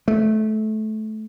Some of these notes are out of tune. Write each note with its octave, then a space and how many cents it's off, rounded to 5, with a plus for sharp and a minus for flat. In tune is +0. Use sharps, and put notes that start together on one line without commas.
A3 -20